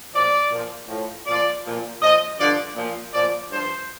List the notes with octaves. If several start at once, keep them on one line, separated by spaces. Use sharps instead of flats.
A#2 F3 D5
A#2 F3
A2 F3
A#2 F3 D5
A#2 F3
A#2 F3 D#5
G2 D3 F3 D5
A#2 F3
A#2 F3 D5
G2 F3 C5